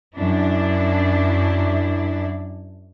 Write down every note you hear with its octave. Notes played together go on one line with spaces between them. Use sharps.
F#2 D4 E4